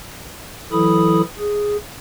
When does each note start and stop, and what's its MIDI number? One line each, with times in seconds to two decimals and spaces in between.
0.71 1.22 52
0.71 1.22 54
0.71 1.22 64
0.71 1.22 69
0.71 1.22 83
0.71 1.22 87
1.39 1.77 68